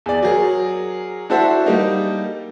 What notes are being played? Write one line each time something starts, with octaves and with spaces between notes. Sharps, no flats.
E2 D5
F#3 G#4 A#4
D4 E4 F#4 A4 C5 E5
G3 A#3 D#4